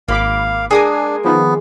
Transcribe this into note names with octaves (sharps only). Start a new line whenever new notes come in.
G#1 A#3 F5 B5 D6
G#3 A#3 D4 A#4 G#5 D#6
D#3 F3 B3